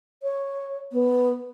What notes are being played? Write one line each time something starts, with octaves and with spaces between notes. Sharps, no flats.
C#5
B3